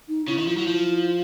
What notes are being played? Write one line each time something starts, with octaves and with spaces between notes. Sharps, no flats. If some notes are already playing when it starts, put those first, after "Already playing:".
D#4
C#3 E4
D#3
F3
F#3
F3